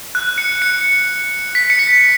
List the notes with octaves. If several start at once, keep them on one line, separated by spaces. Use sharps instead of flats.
F#6
C#7
C#7
B6
C#7
B6